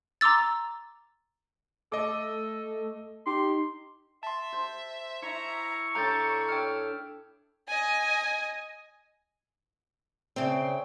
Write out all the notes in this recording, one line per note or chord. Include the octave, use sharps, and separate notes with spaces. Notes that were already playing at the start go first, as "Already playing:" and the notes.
A#5 C6 D6 E6 A6
A3 A4 D#5 D6
D#4 G4 C6
E5 A5 C6
C5
E4 E5 A#5 C#6
A2 D4 G5 A#5 B5 G6 A6
C#5 E5 G5 F6
D#5 G#5
C#3 C4 D5 E5 G5